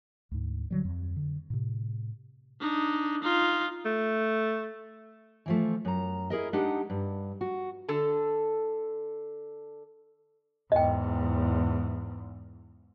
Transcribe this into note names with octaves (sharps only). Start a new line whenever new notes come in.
D2 G#2
D3 F#3 G3
F2
D3
A2 C3
D4 D#4
D#4 F4
A3
E3 F3 A3
F#2 A#5
E4 G#4 A#4 D#5
G#3 D4 D#4 G4 F#5
G2
F#4
D3 A4
E2 G#2 D#5 G5